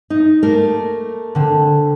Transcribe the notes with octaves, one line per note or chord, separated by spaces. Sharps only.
D#4
A3 A#3 A#4
D3 C4